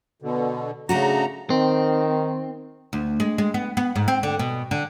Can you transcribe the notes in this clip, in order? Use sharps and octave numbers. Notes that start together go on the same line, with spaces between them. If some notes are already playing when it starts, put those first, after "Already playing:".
B2 D3
C#3 A3 D4 F#4 A#5
D#3 C4
D2
G#3
G#3
B3
B3
G#2
C4
D3
B2
D3